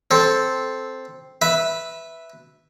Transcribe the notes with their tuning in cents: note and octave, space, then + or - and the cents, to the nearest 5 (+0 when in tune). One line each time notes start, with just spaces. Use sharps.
C4 +0 A4 -5
B4 -5 E5 +0